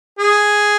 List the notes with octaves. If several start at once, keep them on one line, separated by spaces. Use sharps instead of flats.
G#4